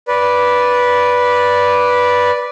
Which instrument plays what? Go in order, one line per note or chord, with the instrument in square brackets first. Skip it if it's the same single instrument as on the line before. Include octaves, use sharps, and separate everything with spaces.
[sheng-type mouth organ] B4 D5